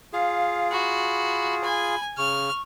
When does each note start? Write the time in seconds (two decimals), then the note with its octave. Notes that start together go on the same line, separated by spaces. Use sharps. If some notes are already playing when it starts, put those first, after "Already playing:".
0.13 F4 G#4 F5
0.72 F#4 B5
1.64 G#5 B5
2.18 C#3 C#6 F6